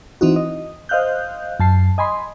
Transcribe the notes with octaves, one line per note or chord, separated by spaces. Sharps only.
E3 C4 D#4 F#4
D#5
C5 D#5 F5 F#6 G6
F#2 A5 C7
D#5 G#5 B5 C6